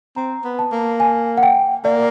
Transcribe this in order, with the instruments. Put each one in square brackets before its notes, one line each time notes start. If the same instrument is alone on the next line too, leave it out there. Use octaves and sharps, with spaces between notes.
[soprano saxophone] C4 [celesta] A#5
[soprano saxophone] B3
[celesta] A5
[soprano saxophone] A#3
[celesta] G#5
F#5
G5
[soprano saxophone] A#3 [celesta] D5